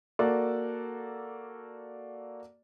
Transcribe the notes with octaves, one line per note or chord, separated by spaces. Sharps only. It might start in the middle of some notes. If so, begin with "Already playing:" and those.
A#3 F#4 A4 D5